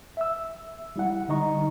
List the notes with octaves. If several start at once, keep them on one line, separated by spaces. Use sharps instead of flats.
E5 E6
G3 E4 F#5
D3 G3 D#4 D#5 A#5 C#6